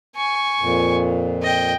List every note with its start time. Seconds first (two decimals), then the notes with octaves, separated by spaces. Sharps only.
0.16 G#5 C#6
0.61 F2 A#2
1.43 D#5 G5